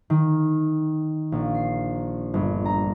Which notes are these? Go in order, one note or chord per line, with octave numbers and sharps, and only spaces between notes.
D#3
A#1
C7
G1
A#5